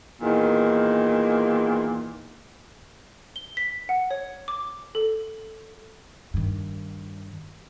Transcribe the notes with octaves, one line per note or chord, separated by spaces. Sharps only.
E2 A#2 D#3
G7
B6
F#5
C#5
D6
A4
G2 D#3